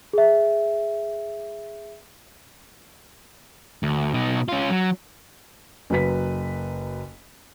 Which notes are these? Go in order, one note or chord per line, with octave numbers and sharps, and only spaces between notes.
G#4 E5
D2
B2 D#4
C#4 F4
F#3
F#1 F#3 B4 B6